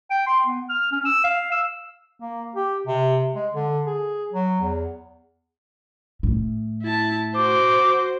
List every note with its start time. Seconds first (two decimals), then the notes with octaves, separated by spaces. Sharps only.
0.11 G5
0.27 C6
0.46 B3
0.69 F6
0.92 C#4
1.05 E6
1.24 F5
1.52 E6
2.20 A#3
2.55 G4
2.87 C3
3.35 G#3
3.54 D3
3.87 G#4
4.32 F#3
4.60 E2
6.23 A2
6.83 E4 A5
7.36 F#4 C5 D6